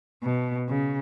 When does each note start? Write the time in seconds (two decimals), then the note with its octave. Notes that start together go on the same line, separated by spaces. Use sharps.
0.24 B2
0.68 C#3